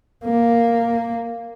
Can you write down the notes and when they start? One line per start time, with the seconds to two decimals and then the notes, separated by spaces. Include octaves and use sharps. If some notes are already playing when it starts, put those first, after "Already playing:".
0.25 A#3